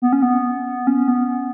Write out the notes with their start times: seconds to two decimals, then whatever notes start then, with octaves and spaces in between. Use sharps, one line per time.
0.02 B3
0.13 C#4
0.22 B3
0.87 C#4
1.08 B3